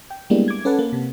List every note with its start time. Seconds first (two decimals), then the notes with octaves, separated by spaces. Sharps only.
0.10 G5
0.30 G3 G#3 A#3 B3 D4 E4
0.48 D6 G#6
0.65 C#4 A4 B4 F#5 A5
0.79 A#3
0.93 C3